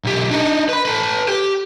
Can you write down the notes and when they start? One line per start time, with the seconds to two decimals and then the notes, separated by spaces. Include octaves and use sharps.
0.04 B1 G4
0.31 D4 D#4
0.69 B4 B5
0.85 A4 B4
1.28 G4